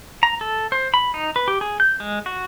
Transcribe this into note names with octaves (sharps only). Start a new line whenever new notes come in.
A#5
A4
C5
B5
D#4
B4
G4
G#4
G6
G#3
F#4